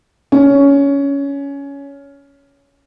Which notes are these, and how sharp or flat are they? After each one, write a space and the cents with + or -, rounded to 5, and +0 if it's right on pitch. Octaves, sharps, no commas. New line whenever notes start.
C#4 +15